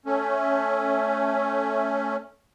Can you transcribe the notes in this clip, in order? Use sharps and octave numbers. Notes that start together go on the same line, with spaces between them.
A3 C#4